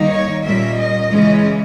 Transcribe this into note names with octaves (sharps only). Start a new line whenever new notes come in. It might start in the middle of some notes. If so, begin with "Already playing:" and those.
Already playing: D#3 G3 A#3 D#4
C#5
A#2 G3 A#3 C#4 E5
D#5
C#3 E3 G#3 C#4